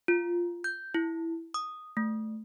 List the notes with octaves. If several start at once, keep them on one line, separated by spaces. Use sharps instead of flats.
F4
G6
E4
D#6
A3